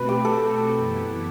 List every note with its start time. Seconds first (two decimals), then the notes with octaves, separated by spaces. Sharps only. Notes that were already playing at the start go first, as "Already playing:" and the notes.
Already playing: B2 A3 C4 F#4 B4
0.09 G4
0.25 A4
0.73 F#2 E3 B3 E4